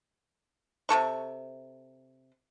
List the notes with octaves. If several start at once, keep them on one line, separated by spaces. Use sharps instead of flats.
C3 A#3 A4 C#6